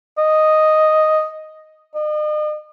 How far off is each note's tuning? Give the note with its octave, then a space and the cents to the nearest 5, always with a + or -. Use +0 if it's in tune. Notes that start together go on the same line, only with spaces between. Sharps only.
D#5 +0
D#5 -40